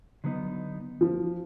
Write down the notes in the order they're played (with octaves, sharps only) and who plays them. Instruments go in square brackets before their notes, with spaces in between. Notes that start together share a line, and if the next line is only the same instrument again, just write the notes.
[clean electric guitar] D3 F#3 B3 D#4
[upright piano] F3